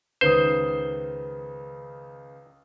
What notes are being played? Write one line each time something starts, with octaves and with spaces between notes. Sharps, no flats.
C#2 D#3 B4 C5 D#6